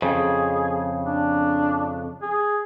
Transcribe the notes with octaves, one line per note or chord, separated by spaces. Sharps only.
F2 C#3 G#4
D4
G#4